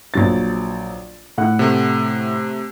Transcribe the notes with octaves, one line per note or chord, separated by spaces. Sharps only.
A#1 F#3 A6
A2 F#5 F#6
C3 A3